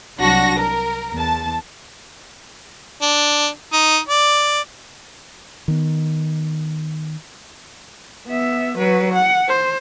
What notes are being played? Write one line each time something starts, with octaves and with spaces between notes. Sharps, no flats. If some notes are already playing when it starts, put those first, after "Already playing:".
C2 F#3 D4 F#4 A5 A#6
A#4
E2 A5
D4
D#4
D5
D#3 B3
B3 E5
F#3 B4
F#5
C5